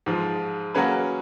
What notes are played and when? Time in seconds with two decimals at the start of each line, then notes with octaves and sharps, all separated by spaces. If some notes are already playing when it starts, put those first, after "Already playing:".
0.06 G#2 F3 G#3
0.75 F#3 A#3 C#4 G#4 B4